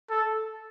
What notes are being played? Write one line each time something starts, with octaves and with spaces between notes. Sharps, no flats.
A4